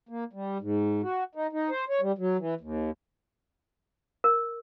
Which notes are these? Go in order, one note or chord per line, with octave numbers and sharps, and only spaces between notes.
A#3
G3
G#2
F#4
D#4
D#4
C5
C#5
G3
F#3
E3
D#2
A#4